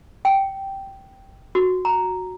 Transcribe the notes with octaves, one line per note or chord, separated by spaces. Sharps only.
G5
F#4
A#5